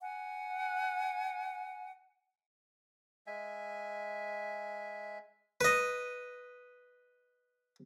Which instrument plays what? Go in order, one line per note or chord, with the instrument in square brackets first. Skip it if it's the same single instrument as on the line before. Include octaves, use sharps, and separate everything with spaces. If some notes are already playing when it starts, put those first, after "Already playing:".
[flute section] F#5 G#5
[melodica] G#3 E5 G#5
[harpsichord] B4 D#5